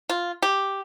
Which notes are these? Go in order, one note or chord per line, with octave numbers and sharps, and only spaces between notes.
F4
G4